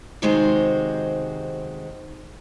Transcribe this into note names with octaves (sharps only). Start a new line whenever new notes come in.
C3 D#3 G#3 F#4 C5